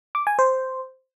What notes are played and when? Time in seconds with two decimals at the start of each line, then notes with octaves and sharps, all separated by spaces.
0.15 D6
0.27 G#5
0.39 C5